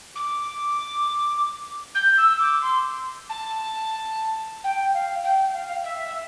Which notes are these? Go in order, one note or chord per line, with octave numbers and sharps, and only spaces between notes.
D6
G6
E6
D6
C6
A5
G5
F5
G5
F5
E5
E5